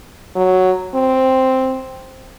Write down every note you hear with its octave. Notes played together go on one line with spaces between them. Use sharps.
F#3
C4